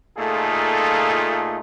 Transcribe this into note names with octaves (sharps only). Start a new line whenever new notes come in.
A#2 A3 D#4 F4 G#4 A4